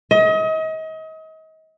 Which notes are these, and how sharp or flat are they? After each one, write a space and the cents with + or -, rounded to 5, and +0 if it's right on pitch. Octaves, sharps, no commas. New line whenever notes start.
D#5 +35